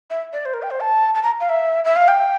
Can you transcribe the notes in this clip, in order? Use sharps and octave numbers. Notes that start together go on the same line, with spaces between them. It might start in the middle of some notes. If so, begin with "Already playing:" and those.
E5
D5
C5
A#4
G5
C5
A5
A5
A#5
F5
E5
E5
F5
G5